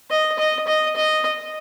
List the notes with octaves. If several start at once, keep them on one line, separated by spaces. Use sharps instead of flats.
D#5
D#5
D#5
D#5